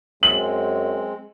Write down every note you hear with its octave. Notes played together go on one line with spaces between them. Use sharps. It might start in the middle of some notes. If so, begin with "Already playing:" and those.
F#2 G#3 C4 F#7